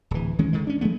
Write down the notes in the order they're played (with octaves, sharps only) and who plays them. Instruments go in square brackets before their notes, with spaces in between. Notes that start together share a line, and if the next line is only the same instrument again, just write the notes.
[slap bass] D1 E3
D#3 E3 G#3 C#4
D3 D#3 G#3
C#4 D4
F3 G#3 A3 B3